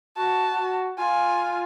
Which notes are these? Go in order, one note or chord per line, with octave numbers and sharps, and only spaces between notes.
F#4 A5
F4 G#5